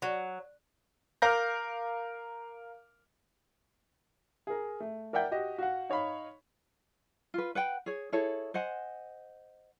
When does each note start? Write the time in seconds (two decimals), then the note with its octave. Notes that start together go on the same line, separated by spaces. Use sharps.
0.02 F#3
1.22 A#4 F5 D6 F6 G6 A#6
4.47 G#4 A#4
4.80 A3
5.13 A#4 D5 E5 F#5 G5 G6
5.31 F#4 G4 D#5
5.58 F#4 F5 F#5
5.89 D#4 C#5 F5 B5
7.34 F4 B4
7.55 B4 F#5 G5
7.86 G#4 C#5
8.12 E4 G#4 A4 C#5
8.54 C5 D#5 F#5 G#5